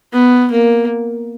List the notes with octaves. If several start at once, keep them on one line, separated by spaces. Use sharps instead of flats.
B3
A#3